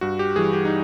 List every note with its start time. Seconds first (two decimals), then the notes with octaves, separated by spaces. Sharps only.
0.01 G2 F#4
0.19 G4
0.36 E3 G3 G#4
0.53 G4
0.65 D#4